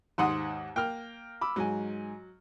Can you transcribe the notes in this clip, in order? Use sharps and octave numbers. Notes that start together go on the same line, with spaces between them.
D#2 G#2 F#5 C6 D#6
A#3 G5 F6
B5 D6 E6
G#2 F#3 G#5